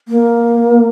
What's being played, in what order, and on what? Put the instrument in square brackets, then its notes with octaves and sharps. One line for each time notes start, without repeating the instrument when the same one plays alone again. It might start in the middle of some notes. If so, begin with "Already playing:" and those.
[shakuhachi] A#3